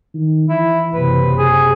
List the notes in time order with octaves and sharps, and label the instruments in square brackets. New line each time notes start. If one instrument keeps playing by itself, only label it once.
[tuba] D#3
[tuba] E3 [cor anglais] E4
[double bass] F#1 C3 [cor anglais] B4
[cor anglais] G#4